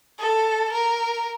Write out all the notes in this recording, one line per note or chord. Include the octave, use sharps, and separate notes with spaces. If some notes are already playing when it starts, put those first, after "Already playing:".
A4
A#4